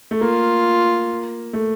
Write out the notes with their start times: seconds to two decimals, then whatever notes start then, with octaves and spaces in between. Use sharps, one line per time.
0.11 A3
0.21 A#3 F4
1.53 A3